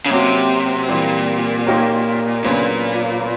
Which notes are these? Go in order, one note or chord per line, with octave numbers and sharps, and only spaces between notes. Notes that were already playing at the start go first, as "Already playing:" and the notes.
C#3
C3 F#3 A#3 C#4 F#4
A#2 E3 G3 C4
A#3 D#4 G4 A#4 C#5
A#2 C#3 F#3 B3 D4
B3